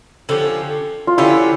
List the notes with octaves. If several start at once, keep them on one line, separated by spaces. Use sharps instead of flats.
D3 F3 C#4 G4
F4
D3 F3 C#4 E4 G4